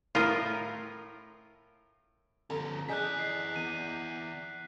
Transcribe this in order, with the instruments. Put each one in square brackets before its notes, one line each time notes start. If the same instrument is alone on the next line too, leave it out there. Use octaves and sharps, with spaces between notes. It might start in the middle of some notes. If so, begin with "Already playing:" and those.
[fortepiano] A2 A#4 [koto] F4 D#5
[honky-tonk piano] G1 A4 A#5 [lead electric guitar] F3 C#4
[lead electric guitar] E3 D5 [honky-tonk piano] G#4 D#5 A5 [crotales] F#6 G6 B6
[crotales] C7
[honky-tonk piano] E2 [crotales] D#7